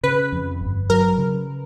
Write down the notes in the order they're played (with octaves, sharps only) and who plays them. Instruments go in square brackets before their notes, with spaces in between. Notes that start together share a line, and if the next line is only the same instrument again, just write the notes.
[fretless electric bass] C#3 [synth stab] B4
[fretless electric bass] F2
G1
[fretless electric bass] F#3 [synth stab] A#4
[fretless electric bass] C#3